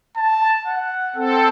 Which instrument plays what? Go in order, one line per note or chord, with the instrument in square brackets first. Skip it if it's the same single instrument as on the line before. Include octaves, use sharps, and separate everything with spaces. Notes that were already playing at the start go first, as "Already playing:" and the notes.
[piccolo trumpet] A5
F#5
[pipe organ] C4 A4